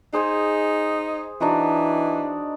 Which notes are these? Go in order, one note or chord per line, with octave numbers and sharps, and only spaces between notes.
D#4 G#4 C5 G#5
E3 D4 D#4 F#4